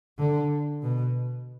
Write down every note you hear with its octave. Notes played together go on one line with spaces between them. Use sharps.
D3
B2